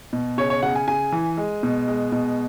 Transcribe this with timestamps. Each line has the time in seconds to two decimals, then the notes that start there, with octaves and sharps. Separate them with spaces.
0.13 B2
0.38 C#3 C#5
0.50 C#5
0.62 C#3 F#5
0.76 G#5
0.88 C#3 G#5
1.12 E3
1.37 G#3
1.63 B2
1.88 G#3
2.12 B2